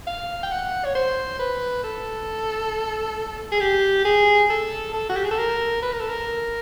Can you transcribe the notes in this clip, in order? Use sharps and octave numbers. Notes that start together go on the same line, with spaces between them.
F5
G5
F#5
C#5
C5
B4
A4
G#4
G4
G#4
A4
A4
F#4
G4
G#4
A4
A#4
B4
A#4
A4
A#4